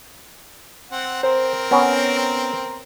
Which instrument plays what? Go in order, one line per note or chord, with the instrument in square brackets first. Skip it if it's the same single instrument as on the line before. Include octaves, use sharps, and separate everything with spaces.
[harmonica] C4 F#5
[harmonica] C4 A#4 [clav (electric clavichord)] C5
[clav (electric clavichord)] B3 C#4